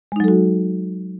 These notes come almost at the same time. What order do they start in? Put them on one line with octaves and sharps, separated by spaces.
G#3 D#4 F#3 A4 F#4